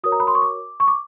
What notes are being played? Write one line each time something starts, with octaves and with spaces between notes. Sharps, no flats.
F#4 A#4 C#5 D#6
A#5
B5
C6
C#6
D6
C#6
D6